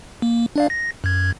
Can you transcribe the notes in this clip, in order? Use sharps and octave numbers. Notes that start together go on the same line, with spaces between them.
A#3
D4 D5 F5
A#6
F#2 G#6